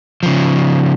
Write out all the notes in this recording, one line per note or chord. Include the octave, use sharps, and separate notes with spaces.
C#3 F3